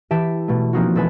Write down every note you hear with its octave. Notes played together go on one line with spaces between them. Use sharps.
E3 G4 E5 A5 B6 D7
B2 A3
F3 A#3 C4 D#4 F4 F#4
E1 A4 B4 G#5 E7